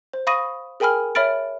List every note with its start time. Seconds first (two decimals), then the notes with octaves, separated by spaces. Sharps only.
0.13 C5
0.27 F5 B5 C#6 D#6 A#6 D#7
0.80 G#4 A#4 G5 G#5 B5 F6
1.15 C#5 E5 B5 F6 A6 D7